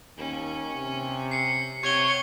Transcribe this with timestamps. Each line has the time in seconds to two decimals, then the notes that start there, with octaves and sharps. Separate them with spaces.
0.18 D#2 C#4
0.76 C3
1.31 C7 C#7
1.83 C3 G4 C#5 F#5 C#6 C#7 G7